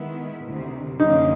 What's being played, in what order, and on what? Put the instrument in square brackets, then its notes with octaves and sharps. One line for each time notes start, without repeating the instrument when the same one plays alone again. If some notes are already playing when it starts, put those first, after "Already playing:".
Already playing: [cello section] D#3 G#3 B3 E4
D2 C3 D#3
[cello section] F#2 D3 F3 A#3 C#4 [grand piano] D#4